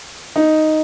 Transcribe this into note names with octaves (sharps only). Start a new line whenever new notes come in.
D#4